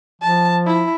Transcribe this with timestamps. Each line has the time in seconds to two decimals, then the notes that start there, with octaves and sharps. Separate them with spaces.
0.22 F3 A5
0.66 E4